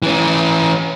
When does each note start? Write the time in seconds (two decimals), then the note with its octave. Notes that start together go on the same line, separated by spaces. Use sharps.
0.02 E3 C#4